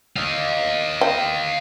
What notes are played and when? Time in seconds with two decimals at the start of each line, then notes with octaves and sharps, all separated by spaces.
0.17 D#5 F5
1.01 G5